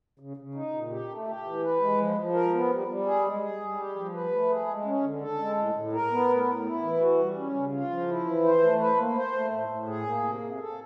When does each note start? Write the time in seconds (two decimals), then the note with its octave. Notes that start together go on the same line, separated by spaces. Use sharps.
0.19 C#3
0.37 C#3
0.55 D#4
0.73 A#2
0.90 G4
1.09 A3
1.27 G4
1.44 E3
1.63 B4
1.80 G#3
1.99 F3
2.16 F3
2.34 A#4
2.52 B3
2.70 G3
2.88 G3
3.06 G#4
3.24 G#3
3.42 G#4
3.60 G3
3.77 G4
3.96 F3
4.13 B4
4.31 A3
4.49 G#4
4.67 G#3
4.85 C#4
5.04 D3
5.21 A4
5.39 G#3
5.57 A2
5.75 A2
5.93 A#4
6.11 B3
6.29 A2
6.47 A2
6.64 E4
6.82 E3
7.00 F#4
7.19 G3
7.37 C#4
7.54 C#3
7.72 F4
7.90 F3
8.08 E4
8.26 E3
8.44 C5
8.61 A3
8.80 B4
8.98 A#3
9.16 C5
9.33 A3
9.51 A2
9.69 A2
9.87 G#4
10.06 A#3
10.23 C3
10.41 C3
10.60 A4